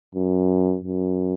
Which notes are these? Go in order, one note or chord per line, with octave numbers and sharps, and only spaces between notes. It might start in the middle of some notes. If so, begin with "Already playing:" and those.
F#2
F#2